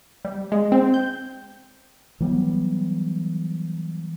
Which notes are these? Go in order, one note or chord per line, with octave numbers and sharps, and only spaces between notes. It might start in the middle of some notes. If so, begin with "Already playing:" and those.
G3
G#3
C4
G6
E3 F#3 G3 B3